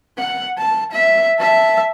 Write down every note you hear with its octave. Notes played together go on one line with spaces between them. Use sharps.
F#5
A5
E5
E5 A5